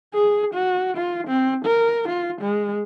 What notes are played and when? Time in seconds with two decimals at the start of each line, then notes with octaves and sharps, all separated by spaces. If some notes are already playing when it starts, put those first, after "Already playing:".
0.14 G#4
0.54 F#4
0.97 F4
1.27 C4
1.65 A#4
2.09 F4
2.41 G#3